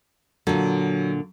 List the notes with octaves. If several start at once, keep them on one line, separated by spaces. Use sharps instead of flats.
A#2 D3 F#3